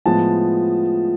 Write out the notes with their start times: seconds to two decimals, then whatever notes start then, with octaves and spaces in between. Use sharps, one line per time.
0.06 A2 F3 G#3 B3 A5